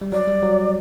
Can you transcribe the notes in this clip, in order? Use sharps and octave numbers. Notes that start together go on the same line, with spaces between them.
G3
F#3 D5
G3
F#3